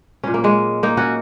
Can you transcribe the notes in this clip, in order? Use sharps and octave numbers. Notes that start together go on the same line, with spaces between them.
A#2 F#3 C#4
A#3
G#3 C#4
A#3 D#4
C#4 F#4